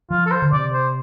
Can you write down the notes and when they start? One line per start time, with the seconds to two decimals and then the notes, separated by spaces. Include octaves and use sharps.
0.10 F3 F4
0.26 A4
0.31 C5
0.42 D3
0.52 C3 D5
0.73 C5